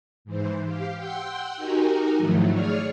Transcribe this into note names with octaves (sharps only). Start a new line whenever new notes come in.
G#2 E3 C5
G4 F5
F#5 G5 C6 E6 G6
D#4 F#4 G4 A#4 G#5
G#2 D#3 F3 F#3 A3 E4
G#4 C#5 D5 C#6 F6